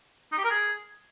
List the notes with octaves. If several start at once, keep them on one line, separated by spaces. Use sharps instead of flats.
D#4
G4
A#4
G#4